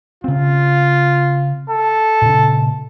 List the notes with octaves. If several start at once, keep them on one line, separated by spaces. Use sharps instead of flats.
C#3 C4 F4
A4
A#2 C#3